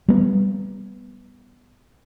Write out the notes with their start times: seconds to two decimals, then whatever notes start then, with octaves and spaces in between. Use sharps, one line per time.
0.08 G3 B3